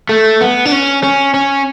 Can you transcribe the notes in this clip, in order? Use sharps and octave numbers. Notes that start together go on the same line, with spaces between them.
A3
B3
D4
C#4
C#4
C#4